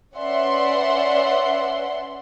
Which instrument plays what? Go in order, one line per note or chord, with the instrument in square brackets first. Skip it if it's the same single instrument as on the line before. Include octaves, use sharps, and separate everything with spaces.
[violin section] C#4 B4 D5 E5 F#5 C6